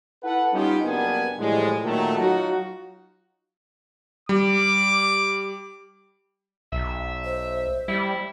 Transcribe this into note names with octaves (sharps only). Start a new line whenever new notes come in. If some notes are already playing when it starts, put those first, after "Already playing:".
E4 A4 B4 F#5
G3 B3 C#4 D#4 F4 G4
F#1 G3 A#3 B3 D4 G#5
A2 E3 F3 G3 G#3
A#2 D#3 F#3 A3
F#3 D#4 F4 F#4
G3 D6
B1 E5
C5
G3 E4